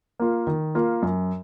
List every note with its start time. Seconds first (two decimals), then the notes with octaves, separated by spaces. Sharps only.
0.19 A#3 F4
0.47 D#3
0.75 A#3 F4
1.02 F#2